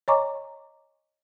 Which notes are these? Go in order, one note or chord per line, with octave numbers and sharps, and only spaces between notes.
C#5 D#5 G#5 A#5 C#6 D6